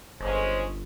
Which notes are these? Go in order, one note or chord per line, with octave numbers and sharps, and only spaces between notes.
G1 G#3 C#4 C5